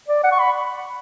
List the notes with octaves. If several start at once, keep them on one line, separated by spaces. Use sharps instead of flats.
D5
F#5
C#6
B5